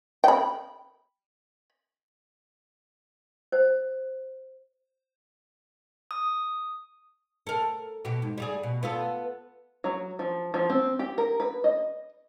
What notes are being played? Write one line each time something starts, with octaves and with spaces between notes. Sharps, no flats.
G5 B5
C5
D#6
A4 A#4
B2 G4
G#2
G3 G4 G#4
B2
B3 F4 A4
F#3
F3
F3
C4
G4
A#4
B4
D#5